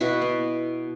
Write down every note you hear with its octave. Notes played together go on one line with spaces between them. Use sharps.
B2 E4 F#4
B3